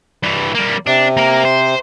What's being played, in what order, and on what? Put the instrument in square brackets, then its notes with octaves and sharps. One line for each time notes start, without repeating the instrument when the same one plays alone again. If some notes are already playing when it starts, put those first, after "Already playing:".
[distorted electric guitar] G2 E3
G3 A#3
[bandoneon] C3 [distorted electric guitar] D4
[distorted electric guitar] A#3 A#4
C5